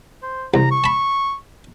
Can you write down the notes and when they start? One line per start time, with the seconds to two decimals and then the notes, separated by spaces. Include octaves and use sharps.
0.23 C5
0.54 C2 A#5
0.71 C#6
0.84 A5 B5